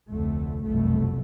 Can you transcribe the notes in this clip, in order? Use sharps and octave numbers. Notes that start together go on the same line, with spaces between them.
F1 D2 D3 A3
F1 C2 F#2 B2 A3